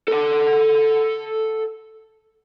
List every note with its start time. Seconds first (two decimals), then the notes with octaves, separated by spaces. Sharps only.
0.08 A4 F#5